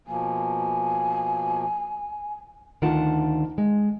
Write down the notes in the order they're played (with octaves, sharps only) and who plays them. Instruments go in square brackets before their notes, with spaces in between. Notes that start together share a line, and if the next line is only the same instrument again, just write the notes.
[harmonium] B2 F3 A#3 [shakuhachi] G#5
[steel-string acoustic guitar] D2 D#3 D4 F4 F#5 A5
G#3